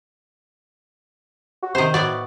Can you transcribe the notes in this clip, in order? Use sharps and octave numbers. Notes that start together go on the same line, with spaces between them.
F#4
C3 D#3 C5
A2 B3 F#4 D5